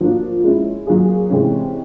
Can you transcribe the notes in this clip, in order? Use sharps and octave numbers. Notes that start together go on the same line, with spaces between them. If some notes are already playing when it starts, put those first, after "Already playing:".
F3 A#3 D4 F#4
G#3 C#4 E4
F#3 A#3 D4 F4 G#4
C3 E3 G#3 C#4